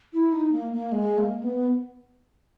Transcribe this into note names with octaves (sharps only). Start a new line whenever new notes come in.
E4
D#4
A#3
A#3
G#3
A#3
B3